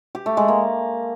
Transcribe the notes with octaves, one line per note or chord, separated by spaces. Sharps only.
G4
A3
G#3
A#3